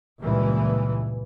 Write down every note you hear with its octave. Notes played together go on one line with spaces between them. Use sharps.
C#2 G2 A#2 E3